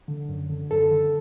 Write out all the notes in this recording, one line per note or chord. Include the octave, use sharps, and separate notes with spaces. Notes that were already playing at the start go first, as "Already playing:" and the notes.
D3
F#2
D3
F#2 A4
D3